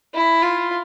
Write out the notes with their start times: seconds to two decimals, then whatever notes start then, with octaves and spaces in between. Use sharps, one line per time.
0.14 E4
0.42 F4